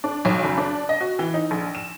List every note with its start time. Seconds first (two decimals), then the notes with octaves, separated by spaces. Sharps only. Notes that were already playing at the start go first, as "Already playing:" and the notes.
0.04 D4
0.25 B1
0.44 F#1
0.58 D4
0.89 D#5
1.01 F#4
1.19 E3
1.34 D#4
1.51 A#1
1.75 E7